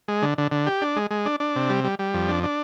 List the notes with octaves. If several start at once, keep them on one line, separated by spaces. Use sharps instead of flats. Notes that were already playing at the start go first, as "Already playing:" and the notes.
G#3
D3
D3
D3
G4
D4
G#3
G#3
D4
D4
C3
G3
G3
G3
F2
D4
D4